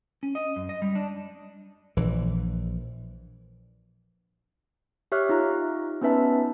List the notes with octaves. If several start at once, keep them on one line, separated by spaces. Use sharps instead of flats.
C#4
D#5
F#2
D#5
G3
D4
A#1 E3
G4 C#5 E5 C#6 F6 F#6
D#4 F4 G4 A#5
B3 C#4 D#4 B4 E5 A5